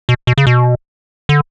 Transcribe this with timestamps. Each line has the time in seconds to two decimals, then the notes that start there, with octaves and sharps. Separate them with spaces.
0.09 B2
0.27 B2
0.38 C#3
0.47 B2
1.29 D3